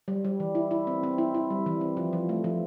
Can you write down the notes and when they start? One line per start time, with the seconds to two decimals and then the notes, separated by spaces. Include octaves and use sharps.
0.08 G3
0.25 G3
0.40 E3
0.55 E4
0.71 E4
0.87 C4
1.03 C4
1.18 E4
1.34 E4
1.50 G3
1.66 E3
1.81 C4
1.97 F3
2.13 F3
2.29 A3
2.44 F3